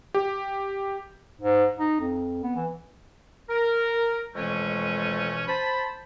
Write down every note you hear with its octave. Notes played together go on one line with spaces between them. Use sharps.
G4
G#2
D#4
F2
B3
E3
A#4
F2 B2 E3 G#3 A3 C#4
C5 A5 B5